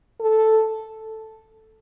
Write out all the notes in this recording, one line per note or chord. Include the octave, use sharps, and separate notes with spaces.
A4